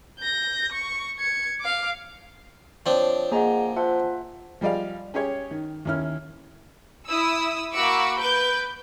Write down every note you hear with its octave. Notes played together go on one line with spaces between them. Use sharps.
G6 A#6
C#6
G#6 C#7
F5 D6
F3 C4 D4 C#5 D5
A#3 G#4 D#5 F#5 G#5 A#5
F4 C5 E5 F#5 A5
F3 G3 G#4 D5 D#5 F5
C#4 G4 G#4 C#5
D#3
D#2 D#3 C#4 E4 F6
E4 D#6 E6
A#3 F#4 B5 C#6 D6 E6
B4 G6 D7